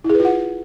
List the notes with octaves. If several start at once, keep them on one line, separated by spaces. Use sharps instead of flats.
E4
G#4
B4
F4
F#5